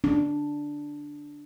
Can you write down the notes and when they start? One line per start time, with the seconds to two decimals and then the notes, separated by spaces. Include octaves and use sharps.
0.04 D4